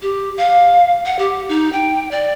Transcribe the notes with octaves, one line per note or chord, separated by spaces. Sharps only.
G4
F5
F#5
G4
D#4
G5
D5